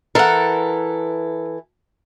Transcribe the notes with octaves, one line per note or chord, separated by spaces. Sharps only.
E3 A4 A#4 F#5